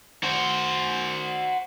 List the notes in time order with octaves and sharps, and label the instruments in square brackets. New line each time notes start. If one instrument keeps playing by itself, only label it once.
[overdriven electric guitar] F#4 C5